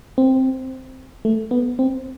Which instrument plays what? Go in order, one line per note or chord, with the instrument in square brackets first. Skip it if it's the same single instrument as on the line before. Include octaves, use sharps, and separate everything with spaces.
[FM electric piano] C4
A3
B3
C4